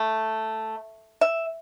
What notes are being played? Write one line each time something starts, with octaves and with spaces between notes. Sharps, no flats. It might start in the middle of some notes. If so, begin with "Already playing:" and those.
Already playing: A3
E5